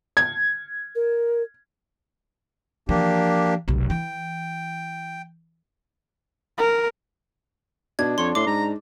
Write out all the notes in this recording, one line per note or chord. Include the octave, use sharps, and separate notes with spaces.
G#6
A#4
E3 F3 A#3 D4 G4
F1 B1
E3 G5
A#4
B2 D4 G#6
F2 C#5 C6
A2 C6 D6
G#2 A#5